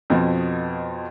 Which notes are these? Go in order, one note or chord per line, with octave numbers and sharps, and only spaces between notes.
F2 B2 F3